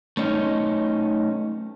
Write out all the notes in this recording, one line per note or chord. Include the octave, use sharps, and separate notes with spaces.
A3 C#4 D#4